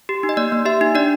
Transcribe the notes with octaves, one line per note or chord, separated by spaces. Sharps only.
G4
D#4
D#5
A#3 D5
A#3
G4 E5
D#4
D4 D5